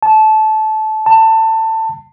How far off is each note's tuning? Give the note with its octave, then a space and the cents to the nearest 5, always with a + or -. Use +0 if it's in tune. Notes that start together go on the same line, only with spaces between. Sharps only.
A5 -20
A5 +20